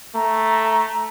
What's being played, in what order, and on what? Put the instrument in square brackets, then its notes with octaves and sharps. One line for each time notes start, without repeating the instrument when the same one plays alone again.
[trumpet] A3 [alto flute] A#5